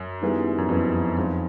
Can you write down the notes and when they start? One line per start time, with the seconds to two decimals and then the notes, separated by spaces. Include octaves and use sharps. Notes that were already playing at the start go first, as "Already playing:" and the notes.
Already playing: F#2
0.21 D#3 G3 B3 E4 G#4
0.58 F#2
0.69 F2 D#3 G3 B3 E4 G#4
1.17 F2 D#3 G#3 C4 F4